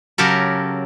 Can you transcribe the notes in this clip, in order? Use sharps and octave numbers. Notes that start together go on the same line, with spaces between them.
C#3 F#3 G4 A4 A#4